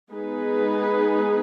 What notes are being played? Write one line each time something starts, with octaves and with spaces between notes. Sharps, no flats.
G#3 B3 D#4 G#4 B4